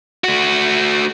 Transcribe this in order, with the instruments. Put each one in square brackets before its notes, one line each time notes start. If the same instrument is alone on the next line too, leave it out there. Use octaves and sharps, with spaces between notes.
[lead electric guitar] A3 F#4